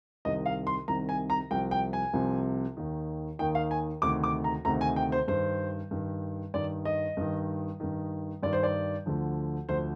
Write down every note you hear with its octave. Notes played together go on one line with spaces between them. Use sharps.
C2 C3 D#3 D#5
F5
C6
C2 C3 D#3 A#5
G#5
A#5
C2 C3 F3 G5
G5
G#5
C2 C3 F3
D#2 D#3
D#2 D#3 G5
F5
G#5
D2 C3 D#3 D6
D6
A#5
D2 C3 D#3 A#5
G#5
G5
C5
G2 D#3 C5
G2 D#3
G2 D#3 D5
D#5
G2 D#3
G2 D#3
G2 D#3 D5
C5
D5
D2 D3 F3
D2 D3 F3 C5